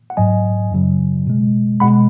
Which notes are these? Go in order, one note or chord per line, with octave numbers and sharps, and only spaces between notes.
F#5
G#2 F#3 D#5 G#5
F#2 C#3 F#3
B2 G#3
B2 G#3 F#5 B5